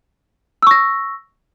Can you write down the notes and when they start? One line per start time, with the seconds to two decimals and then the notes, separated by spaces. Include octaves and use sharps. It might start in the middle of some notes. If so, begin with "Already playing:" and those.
0.63 E6
0.67 C#6
0.71 A#6